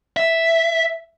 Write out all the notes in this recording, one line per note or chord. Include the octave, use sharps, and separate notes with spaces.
E5